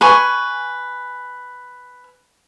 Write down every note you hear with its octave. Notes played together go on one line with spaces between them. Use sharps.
B4 G#5 C#6